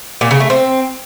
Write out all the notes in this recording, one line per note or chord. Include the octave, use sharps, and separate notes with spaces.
A#2
C#3
A3
C4